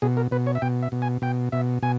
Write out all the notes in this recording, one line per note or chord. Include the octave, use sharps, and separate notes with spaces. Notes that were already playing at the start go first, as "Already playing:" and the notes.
B2 G#4
A#4
B2 B4
C#5
E5
B2 G5
E5
B2
G#5
B2 G5
B2 E5
B2 G#5